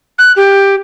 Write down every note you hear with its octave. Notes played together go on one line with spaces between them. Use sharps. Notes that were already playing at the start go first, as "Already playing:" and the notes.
F#6
G4